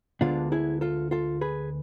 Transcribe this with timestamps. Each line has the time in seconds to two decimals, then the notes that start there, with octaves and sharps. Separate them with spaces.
0.21 D2 D3 G#3 B3 D4 F4
0.52 E4 G#4
0.81 F4 A4
1.11 F4 A4
1.41 G#4 B4